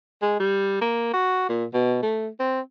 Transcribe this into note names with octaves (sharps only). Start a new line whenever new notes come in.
G#3
G3
A#3
F#4
A#2
B2
A3
C4